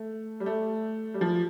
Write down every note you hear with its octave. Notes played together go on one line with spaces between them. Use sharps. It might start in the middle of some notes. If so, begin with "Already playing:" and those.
Already playing: A3
G3
A3
G3
F3